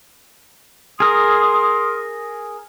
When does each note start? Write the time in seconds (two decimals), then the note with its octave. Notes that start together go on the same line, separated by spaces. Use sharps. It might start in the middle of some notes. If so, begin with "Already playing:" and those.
1.00 G#4 A#4 C6 D#6